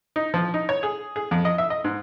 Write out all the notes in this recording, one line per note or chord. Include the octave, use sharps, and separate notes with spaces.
D#4
F3
D#4
C#5
G#4
G#4
F2
D#5
E5
D#5
G#2